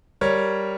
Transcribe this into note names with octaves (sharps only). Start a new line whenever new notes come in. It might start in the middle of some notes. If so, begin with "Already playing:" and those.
G3 A#4 C#5